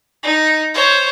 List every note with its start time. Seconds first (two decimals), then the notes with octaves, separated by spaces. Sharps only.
0.23 D#4
0.74 C5 C#5